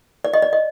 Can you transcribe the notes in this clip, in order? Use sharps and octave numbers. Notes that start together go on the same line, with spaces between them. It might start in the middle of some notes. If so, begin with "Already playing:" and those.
D5
D#5
D5
D#5